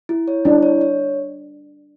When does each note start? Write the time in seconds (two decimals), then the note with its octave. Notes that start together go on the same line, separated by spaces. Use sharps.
0.09 E4
0.28 C#5
0.45 D4 E4
0.63 C#5
0.81 C#5